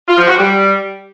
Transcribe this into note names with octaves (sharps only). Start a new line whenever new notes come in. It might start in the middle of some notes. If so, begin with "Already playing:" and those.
F4
F3
F#4
G3